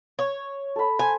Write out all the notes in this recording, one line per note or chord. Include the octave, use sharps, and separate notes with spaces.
C#5
A4 B5
C5 G#5